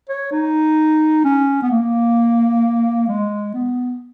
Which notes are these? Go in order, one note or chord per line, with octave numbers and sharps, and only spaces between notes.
C#5
D#4
C#4
B3
A#3
G#3
B3